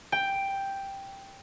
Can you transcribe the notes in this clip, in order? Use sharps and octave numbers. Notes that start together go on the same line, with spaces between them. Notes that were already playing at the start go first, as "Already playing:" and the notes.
G5